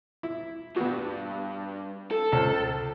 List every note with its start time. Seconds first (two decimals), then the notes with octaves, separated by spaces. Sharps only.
0.23 E4
0.76 G2 B3 F#4
2.12 A4
2.32 C#2 C5